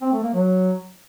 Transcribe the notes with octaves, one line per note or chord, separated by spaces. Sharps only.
C4
A3
A#3
F#3